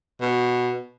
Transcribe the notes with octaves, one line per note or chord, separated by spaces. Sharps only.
B2